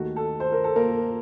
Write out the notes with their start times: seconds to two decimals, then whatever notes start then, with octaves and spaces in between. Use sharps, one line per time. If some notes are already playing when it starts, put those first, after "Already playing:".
Already playing: D#2 D#3 A3 F#4
0.16 A4
0.40 C5
0.52 A#4
0.64 A4
0.76 A#3 A#4